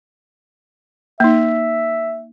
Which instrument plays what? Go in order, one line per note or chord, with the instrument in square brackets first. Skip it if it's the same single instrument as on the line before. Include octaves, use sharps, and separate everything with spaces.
[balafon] A#3 D#4 [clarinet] E5